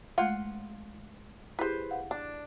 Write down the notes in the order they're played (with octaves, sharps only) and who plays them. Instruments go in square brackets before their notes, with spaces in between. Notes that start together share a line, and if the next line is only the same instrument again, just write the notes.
[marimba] G#3 A3 [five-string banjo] F4 F#5
[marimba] E4 G4 G#4 [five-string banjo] B4 C5
[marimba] F5 F#5
[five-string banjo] D4